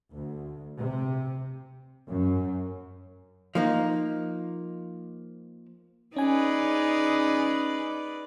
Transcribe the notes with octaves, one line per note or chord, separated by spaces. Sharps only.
D2
C3
F#2
F3 A#3 D#4
C#4 D#4 G#4 B4 D5 G#5